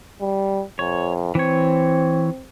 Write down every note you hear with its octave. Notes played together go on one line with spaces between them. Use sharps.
G3
F2 C#5
E3 C4 C#5